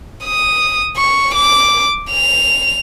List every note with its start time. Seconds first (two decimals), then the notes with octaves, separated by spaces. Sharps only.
0.25 D#6
0.97 C#6
1.35 D6
2.11 F7